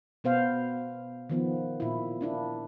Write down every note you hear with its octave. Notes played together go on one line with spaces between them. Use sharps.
B2 B3 C5 F5
D#3 F3 B3
A#2 E4
A#3 D4 E4